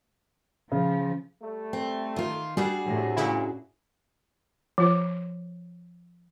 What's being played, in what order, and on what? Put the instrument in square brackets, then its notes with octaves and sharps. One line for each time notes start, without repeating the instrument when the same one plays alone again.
[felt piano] C#3 [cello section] F3
[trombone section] G3 A3
[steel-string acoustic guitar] C4
D#3 F4
[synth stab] G3 [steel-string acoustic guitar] D4 F#4 G#4
[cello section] A2 [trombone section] C3
[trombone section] G2 A#2 [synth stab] C#3 E4
[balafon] F3 F4 C5